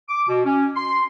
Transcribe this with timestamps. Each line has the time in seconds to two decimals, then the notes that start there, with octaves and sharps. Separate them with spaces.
0.09 D6
0.28 B2
0.45 C#4
0.75 C6